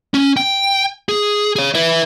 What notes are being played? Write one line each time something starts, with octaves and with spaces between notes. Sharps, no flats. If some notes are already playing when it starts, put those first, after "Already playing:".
C#4
G5
G#4
G#4 C#5
B4 E5